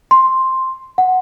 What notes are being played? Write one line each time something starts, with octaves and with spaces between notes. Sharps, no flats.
C6
F#5